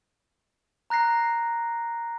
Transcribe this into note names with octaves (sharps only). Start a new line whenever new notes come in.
A#5 F#6 A#6 C7